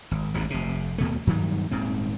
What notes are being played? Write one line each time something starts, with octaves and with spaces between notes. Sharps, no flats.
G#1
G#1 D#2 G#2
F1 C3
D#2 B2 A3
G2 D#3 F#3 G3
D#1 G#2 C4